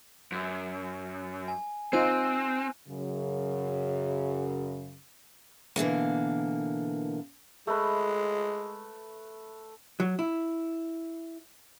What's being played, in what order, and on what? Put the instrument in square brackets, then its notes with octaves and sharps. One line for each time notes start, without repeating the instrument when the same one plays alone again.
[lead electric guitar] F#2
[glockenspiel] G#5
[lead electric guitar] C4 [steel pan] D#4 F4 C5 [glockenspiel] G#5 F#6 D#7
[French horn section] F#2 C#3
[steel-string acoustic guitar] B2 D3 E3 A#3
[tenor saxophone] G#3 [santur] A3 B4
[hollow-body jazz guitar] F#3
E4